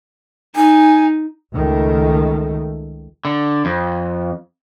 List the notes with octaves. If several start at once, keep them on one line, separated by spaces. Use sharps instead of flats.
D#4 G#5
C#2 D#3 A3
D3
F2